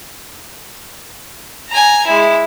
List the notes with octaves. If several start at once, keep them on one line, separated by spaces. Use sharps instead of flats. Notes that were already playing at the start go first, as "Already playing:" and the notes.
G#5 A#5
G#3 E4